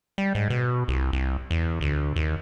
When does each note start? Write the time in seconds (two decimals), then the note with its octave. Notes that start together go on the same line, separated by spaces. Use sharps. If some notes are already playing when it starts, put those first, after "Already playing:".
0.18 G3
0.35 G#2
0.50 B2
0.88 C2
1.13 C2
1.51 E2
1.81 D2
2.16 D#2